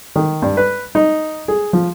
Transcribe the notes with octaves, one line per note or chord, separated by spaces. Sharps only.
D#3
G2
B4
D#4
G#4
F3